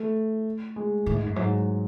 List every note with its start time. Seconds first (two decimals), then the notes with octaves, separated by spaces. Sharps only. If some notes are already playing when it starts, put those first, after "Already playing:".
Already playing: A3
0.76 G#3
1.06 A2
1.16 G#2
1.26 F#2
1.36 G#2 F#3